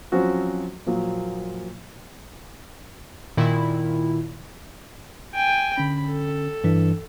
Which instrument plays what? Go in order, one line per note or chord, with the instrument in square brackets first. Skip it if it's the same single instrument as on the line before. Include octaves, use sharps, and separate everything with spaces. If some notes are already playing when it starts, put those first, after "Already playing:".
[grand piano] F3 F#3 C4 C#4 F#4
A#2 F3 F#3 A#3
[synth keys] A#2 D#3 E4
[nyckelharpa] G5 G#5
[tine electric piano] D3 C#4 [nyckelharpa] B5
[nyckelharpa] A4
[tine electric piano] G2 E3 D4